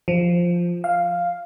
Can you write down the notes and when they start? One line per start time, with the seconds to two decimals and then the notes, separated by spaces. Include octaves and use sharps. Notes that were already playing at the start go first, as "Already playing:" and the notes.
0.08 F3
0.84 F5